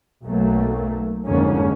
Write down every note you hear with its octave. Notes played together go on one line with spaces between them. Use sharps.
B1 F#3 A3 A#3
G#1 F2 G#2 D3 A#3 C#4